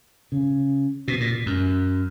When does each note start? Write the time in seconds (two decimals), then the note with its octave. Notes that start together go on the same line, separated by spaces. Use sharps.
0.32 C#3
1.08 B2
1.20 A#2
1.46 F#2